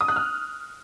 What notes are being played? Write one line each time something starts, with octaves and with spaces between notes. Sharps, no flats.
D#6
F#6
F6